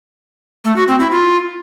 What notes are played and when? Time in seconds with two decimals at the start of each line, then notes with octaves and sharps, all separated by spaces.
0.64 A3
0.76 F#4
0.88 C4
0.99 E4
1.11 F4